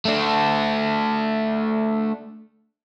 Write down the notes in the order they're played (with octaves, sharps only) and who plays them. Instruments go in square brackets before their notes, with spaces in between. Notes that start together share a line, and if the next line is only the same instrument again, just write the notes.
[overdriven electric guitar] A3 D4